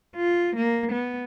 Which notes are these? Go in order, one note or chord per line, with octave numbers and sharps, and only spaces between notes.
F4
A#3
B3